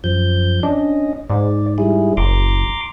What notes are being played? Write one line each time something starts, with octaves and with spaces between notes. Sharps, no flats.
F#2 F3 G6
C#4 D4 D#5
G#2 D5
G3 E4 G#4
F#1 A#5 C6 D6